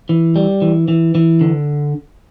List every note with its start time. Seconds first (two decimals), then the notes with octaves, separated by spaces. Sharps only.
0.09 E3
0.36 G3
0.62 E3
0.88 E3
1.15 E3
1.41 D3